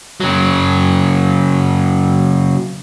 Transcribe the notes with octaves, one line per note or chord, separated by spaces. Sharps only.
C#3 F#3